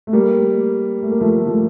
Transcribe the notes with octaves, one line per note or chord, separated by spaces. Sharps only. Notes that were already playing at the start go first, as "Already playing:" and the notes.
A3
G3 A#3
A3
A#3
F3 A3
F3 A3